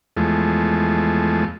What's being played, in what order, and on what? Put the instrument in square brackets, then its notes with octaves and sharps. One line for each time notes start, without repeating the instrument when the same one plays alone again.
[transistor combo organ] E2 F3 G#3 A3